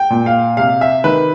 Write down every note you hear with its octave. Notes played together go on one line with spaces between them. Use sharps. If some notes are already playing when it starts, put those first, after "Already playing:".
Already playing: G5
A#2
F5
C3 F5
E5
D#3 B4